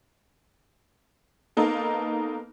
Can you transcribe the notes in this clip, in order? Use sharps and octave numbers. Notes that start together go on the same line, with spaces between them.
A#3 B3 D#4 A4